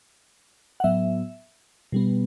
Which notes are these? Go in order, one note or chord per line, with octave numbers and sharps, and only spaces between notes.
F#5
A2 F#3 B3 E5
B2 G3 B3